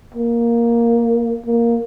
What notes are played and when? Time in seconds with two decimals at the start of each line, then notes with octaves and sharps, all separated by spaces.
0.15 A#3
1.46 A#3